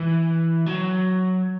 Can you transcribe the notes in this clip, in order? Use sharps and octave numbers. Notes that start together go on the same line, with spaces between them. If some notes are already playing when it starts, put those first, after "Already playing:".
Already playing: E3
F#3